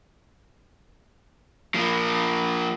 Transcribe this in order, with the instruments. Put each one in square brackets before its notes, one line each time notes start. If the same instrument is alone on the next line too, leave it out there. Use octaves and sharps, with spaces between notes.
[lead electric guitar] F3 A#3